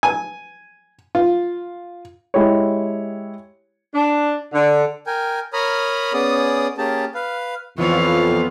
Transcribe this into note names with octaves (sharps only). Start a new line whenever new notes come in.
G#5
F4
G#3 E4 G4 C#5
D4
D3
A#4 G5 G#5
A#4 C#5 A#5 B5 D#6 F6
B3 C#4 G#4 D5 D#6
A#3 C#4 G4 G#4 A5
B4 F5
F2 E3 F3 B3 F4 C#5 F5